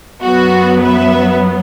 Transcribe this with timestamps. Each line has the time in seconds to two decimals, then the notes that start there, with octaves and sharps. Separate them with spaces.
0.23 F#2 F#3 B3 F#4
0.81 B4 E5